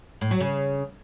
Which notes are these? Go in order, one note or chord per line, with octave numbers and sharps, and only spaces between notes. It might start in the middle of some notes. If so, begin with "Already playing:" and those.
A2
F#3
C#3